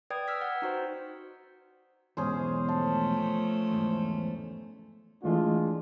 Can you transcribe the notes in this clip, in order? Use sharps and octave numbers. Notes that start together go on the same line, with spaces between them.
B4 D5 G5 D#6 G#6
E6 F6 B6
F#5
D#4 F#4 C5
E2 G#2 B2 C#4 G#4 C5
F3 A3 A5
E2 G#2
E3 G#3 A3 D4 F4